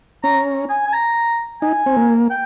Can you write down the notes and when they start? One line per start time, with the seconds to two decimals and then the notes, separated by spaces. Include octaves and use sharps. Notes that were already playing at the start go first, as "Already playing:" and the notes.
0.24 C#4 A#5
0.70 G#5
0.87 G#5
0.93 A#5
1.62 D#4 G#5
1.86 C4
1.97 A#3
2.31 G5